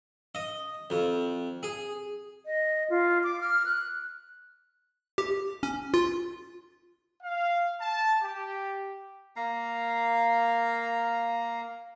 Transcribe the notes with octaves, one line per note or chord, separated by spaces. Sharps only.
D#5
F2
G#4
D#5
F4
D6
F6
F#6
G4
C#4
F4
F5
A5
G4
A#3 F5 A#5